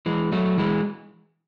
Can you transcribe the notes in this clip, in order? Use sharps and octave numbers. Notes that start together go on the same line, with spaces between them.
E3 G#3
F#3 A3
E3 G#3